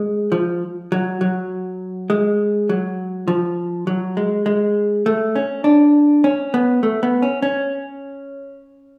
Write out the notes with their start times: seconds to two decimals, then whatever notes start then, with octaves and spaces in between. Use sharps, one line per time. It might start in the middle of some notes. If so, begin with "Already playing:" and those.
Already playing: G#3
0.32 F3
0.92 F#3
1.21 F#3
2.10 G#3
2.69 F#3
3.28 F3
3.87 F#3
4.17 G#3
4.46 G#3
5.06 A3
5.36 C#4
5.64 D4
6.24 C#4
6.54 B3
6.83 A3
7.03 B3
7.22 C#4
7.42 C#4